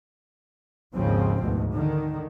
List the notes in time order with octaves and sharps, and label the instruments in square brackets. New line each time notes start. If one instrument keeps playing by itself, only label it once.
[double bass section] G#1 D#2 G#2 C#3 F3 C4
G#1 D2 G#2 B2
D3 D#3